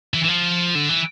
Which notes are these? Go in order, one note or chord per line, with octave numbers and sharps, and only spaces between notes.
E3
E3
F3
D3
E3